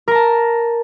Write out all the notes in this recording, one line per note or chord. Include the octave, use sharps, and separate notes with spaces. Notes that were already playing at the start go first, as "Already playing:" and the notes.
A#4 A5 A#5